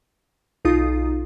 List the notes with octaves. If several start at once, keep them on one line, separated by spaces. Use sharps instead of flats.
B1 D#4 F4 D#6